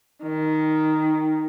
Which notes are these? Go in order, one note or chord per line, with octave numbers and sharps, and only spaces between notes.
D#3